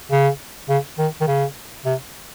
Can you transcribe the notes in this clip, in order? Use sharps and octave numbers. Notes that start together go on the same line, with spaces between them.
C#3
C#3
D#3
D#3
C#3
C3